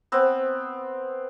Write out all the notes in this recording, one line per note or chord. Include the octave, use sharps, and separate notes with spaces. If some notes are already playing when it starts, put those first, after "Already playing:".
B3 C4